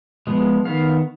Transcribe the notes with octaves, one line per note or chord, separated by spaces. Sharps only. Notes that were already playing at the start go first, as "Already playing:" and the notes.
F3 G#3 B3
D#3 B3 F5